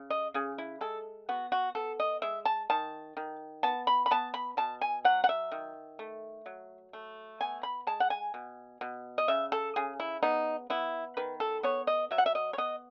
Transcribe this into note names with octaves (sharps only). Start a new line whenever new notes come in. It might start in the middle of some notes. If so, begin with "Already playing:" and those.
Already playing: C#3
D#5
C#3 G#4
E4
G#3 A4
B3 F#4
F#4
B3 A4
D#5
G#3 E5
A5
D#3 A5
D#3
B3 A5
B5
B5
B3 A5
B5
B2 A5
G#5
F#3 F#5
F#5
E5
D#3
A3
F#3
A3
B3 G#5
B5
G#3 A5
F#5
G#5
B2
B2
D#5
C#3 E5
A4
C#3 G#4
E4
B3 D#4
B3 E4
D#3 B4
A4
B3 C#5
D#5
F#3 E5
F#5
E5
D#5
C#5
B3 D#5